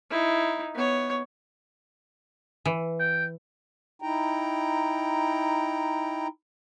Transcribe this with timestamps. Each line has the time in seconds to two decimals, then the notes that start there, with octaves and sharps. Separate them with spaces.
0.11 D#4 E4
0.75 B3 C#5
2.65 E3
3.00 G5
4.02 D#4 E4 G5 A#5